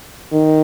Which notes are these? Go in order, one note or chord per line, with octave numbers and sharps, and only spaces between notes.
D#3